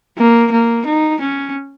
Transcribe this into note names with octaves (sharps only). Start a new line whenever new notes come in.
A#3
A#3
D#4
C#4